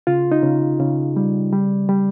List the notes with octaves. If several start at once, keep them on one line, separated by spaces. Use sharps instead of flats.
C#3 F4
D#4
C#3
C#3
G3
G3
G3